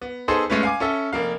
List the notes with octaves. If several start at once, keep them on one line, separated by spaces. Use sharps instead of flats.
B3
B3 D#4 G#4 A4 C5
G#3 A3 C#4 B4
F5 G#5 D6
C#4 A4 E5
F1 A#3 F5